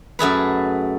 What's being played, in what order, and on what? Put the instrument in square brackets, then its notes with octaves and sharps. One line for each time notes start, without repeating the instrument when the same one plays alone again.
[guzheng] F#2 A3 G#4 B4